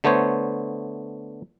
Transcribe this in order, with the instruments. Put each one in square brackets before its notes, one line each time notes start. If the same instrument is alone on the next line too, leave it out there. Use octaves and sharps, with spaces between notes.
[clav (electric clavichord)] D3 A3 B3 C5 C#5